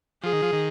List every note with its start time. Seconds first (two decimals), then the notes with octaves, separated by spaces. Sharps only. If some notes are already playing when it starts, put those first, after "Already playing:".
0.23 F3 G#4
0.33 D#3
0.42 F3
0.52 D#3